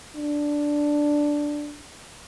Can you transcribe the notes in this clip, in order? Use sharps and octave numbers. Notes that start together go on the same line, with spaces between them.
D4